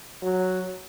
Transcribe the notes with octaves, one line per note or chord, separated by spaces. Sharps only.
F#3